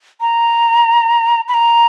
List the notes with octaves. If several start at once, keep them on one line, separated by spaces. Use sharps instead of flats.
A#5
B5
A#5